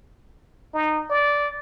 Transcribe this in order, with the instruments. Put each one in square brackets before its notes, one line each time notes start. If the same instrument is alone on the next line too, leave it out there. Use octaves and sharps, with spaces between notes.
[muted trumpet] D#4
D5